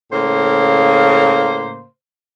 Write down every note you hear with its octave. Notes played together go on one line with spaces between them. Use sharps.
A2 C#3 A#3 C5